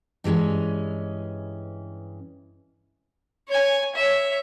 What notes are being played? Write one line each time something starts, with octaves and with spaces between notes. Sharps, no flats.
G2 E3 G#3 C#4
C#5 G#5
C#5 E5